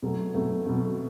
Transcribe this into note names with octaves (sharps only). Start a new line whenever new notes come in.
B2 F#3 A3
B2 F#3 A3
B2 F#3 A3